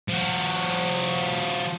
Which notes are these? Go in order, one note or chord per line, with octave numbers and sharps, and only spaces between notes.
F3 F#4